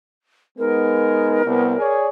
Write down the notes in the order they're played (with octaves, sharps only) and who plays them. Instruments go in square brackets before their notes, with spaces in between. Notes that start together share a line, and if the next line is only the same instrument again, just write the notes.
[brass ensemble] G#3 B3 D#4 [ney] A#4
[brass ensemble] C2 B3
G#4 C#5 D5